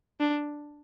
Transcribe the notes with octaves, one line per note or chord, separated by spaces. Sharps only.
D4